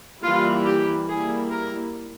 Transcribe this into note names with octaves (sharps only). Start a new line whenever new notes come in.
E3 G3 A#3 E4 F4
G4
G3 A#3 E4 G#4
A#4